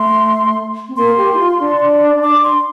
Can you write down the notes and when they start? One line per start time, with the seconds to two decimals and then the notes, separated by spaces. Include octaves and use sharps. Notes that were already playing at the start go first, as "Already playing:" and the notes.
Already playing: A3 C6
0.88 C4
0.96 A#3 C6
1.17 G4
1.34 E4
1.39 F4
1.59 D4
2.23 D6
2.44 C6